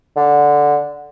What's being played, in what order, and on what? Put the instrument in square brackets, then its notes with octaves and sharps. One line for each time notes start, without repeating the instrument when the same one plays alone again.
[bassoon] D3